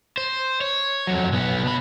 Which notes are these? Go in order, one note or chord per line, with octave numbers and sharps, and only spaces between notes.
C5
C#5
F2 F#3
B1 B3
B2 B5